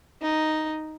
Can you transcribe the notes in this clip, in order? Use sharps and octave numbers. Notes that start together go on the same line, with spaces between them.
D#4